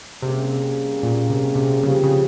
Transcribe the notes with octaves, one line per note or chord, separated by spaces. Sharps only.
C3 G3 A#3 C#4 G#4
A#2
C3
C3
C#3 F3 C4 G4
C#3